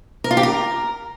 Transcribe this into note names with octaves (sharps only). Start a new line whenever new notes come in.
A#4
F4
G4
A#4